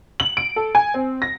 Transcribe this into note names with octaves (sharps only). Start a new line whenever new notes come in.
F#7
D7
A4
G#5
C4
A#6